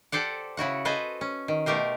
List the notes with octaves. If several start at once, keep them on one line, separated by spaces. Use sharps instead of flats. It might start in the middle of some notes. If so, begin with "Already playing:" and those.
G4 A4 C5 D5 F#5
C#3 E4 F#4 F#5
A4 B4 C5 D#5 G#5
C#4
D#3
B2 A3 G4 A#4 C5